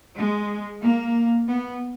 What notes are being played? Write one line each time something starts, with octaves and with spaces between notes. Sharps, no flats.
G#3
A#3
B3